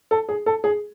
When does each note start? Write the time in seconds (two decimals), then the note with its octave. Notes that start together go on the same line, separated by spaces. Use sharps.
0.11 A4
0.29 G#4
0.46 A4
0.64 G#4